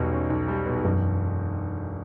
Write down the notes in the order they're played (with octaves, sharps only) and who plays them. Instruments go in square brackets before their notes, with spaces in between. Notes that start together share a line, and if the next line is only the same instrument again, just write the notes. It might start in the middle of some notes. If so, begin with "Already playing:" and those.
Already playing: [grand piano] B1 B2 G3 [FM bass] E2
[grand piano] C#4
B1
G3
B2
[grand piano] E1 [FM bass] F#2